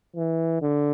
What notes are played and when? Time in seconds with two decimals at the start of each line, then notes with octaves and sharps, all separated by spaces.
0.16 E3
0.62 D3